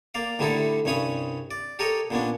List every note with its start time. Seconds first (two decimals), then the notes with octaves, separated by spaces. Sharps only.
0.15 A#3 D5 F5
0.39 A2 D3 G3 D#4 E4 A4
0.85 C2 G2 C#4 C#5 B5 D#6
1.51 D5
1.79 G4 A4 A#4 C#5 D#5
2.11 A#2 B3 C#4 D4